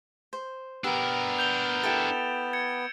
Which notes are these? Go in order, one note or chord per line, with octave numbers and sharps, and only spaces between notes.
C5
B3 D4 G4 A#4 D5 E6
G6 F7 G7
E4 G4 A4 A6 D7 E7
G#6 C#7